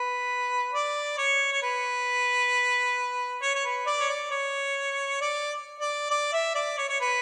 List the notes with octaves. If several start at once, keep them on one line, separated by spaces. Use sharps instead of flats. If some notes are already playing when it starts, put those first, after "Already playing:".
Already playing: B4
D5
C#5
C#5
B4
C#5
C#5
B4
D5
C#5
D5
C#5
D5
D5
D5
E5
D5
C#5
C#5
B4